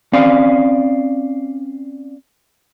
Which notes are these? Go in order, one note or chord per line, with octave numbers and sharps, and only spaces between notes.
C4 C#4 D5 F5